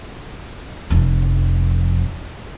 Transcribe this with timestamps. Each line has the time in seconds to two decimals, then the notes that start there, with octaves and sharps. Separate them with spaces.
0.90 F1 F2